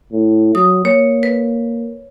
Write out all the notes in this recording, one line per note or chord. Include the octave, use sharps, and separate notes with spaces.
A2
F#3 D#6
A#3 C#5
B4